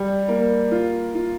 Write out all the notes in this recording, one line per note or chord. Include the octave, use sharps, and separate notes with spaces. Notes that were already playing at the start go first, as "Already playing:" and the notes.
Already playing: G3
A#3
F4
F4